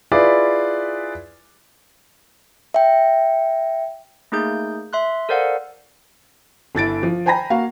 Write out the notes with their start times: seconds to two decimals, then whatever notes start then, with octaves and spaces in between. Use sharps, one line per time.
0.12 E4 F4 G#4 B4 D5
2.74 E5 G5
4.32 A3 A#3 D#4 G#4 G6
4.93 E5 C6 F#6
5.29 A4 A#4 C5 D5 F5 F#5
6.75 G1 E4 A6 D7
7.03 F3
7.26 C5 G5 G#5 A#5 B5 A#6
7.50 A#3 F#4 F5